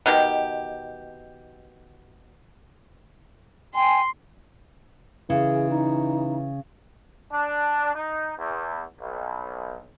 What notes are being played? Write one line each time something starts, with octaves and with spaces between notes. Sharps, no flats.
B2 D#3 G4
G5 G#5 C6
C#3 E3 G#4
D#4
D4
D#4
E2
B1